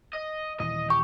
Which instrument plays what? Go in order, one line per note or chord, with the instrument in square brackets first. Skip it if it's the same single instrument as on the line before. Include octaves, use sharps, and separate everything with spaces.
[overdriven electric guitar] D#5
[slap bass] D#1 E3 [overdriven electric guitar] D#5
[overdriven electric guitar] G4 [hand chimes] C#6